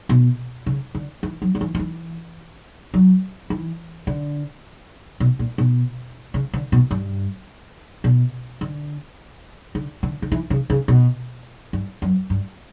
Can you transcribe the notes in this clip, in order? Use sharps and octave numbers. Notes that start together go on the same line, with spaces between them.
B2
C#3
D3
E3
F#3
F#3
E3
F#3
E3
F#3
E3
D3
B2
A#2
B2
C#3
D3
B2
G2
B2
D3
D3
D3
D3
E3
C#3
C#3
B2
G2
F#2
G2